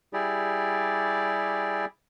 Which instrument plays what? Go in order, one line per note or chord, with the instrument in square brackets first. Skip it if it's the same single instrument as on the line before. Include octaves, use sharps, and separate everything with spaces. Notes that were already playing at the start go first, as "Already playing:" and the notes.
[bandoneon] G3 E4 G4 G#4 D5